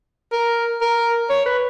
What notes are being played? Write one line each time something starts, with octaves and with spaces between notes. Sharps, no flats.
A#4
A#4
C#5
B4